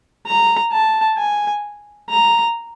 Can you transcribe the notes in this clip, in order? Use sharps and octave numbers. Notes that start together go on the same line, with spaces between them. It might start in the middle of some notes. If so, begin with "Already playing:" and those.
A#5
A5
G#5
A#5